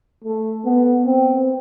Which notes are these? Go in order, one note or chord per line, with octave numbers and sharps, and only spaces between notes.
A3
B3
C4